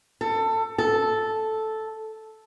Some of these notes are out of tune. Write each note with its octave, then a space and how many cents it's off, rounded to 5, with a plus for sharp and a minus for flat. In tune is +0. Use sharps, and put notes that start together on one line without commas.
A4 +20
A4 -5